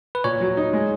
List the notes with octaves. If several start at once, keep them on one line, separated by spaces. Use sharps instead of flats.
B4
A#2 C#5
F#3
D#4
G#3